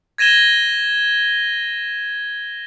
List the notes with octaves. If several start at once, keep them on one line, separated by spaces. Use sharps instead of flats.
G#6 A#6 D#7 E7 G7